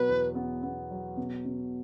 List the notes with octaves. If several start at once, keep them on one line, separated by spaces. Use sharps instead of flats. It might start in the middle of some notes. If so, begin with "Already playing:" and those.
Already playing: B2 F#3 B4
E2
B3
B3
F#3
B2
B2